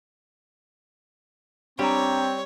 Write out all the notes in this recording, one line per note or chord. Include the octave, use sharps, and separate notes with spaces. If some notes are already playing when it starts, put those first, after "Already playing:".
G3 C4 D4 G4 C#5 A#5